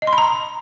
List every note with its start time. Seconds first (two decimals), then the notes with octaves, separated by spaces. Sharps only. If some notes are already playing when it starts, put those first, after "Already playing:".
0.02 D#5
0.07 C6
0.13 B5
0.18 A#5